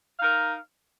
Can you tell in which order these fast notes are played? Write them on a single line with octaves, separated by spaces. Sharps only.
F5 D#4 A#4